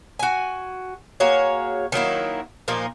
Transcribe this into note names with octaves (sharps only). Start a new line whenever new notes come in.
F#4 G#5
A#3 F#4 G#4 C#5
D#3 F#3 A#3 E4
A#2 F3 A#3 D#4